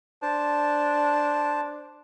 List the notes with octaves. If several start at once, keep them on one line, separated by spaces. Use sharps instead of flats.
D4 C5 A5